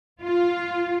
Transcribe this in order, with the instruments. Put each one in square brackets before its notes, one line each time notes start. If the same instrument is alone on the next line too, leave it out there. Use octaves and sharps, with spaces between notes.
[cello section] F4